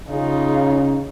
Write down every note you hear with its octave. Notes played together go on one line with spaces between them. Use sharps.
C#3 D#4 F4